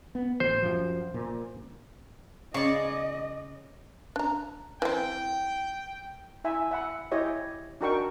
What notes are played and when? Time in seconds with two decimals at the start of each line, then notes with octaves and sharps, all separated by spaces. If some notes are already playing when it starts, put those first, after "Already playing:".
0.15 B3
0.40 A1 C5
0.63 F#2 F3
1.14 A#2
2.54 C#3 D5 D#5 C#6
4.16 D4 A#5
4.82 E3 C4 G5
6.44 E4 E5 G#5
6.71 E5 F#5 B5
7.12 E4 G4 C#5 D#5
7.81 D4 D#4 F#4 A#4 G5 C#6